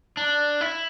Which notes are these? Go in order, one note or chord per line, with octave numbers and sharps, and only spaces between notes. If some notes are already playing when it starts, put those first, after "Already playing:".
D4
E4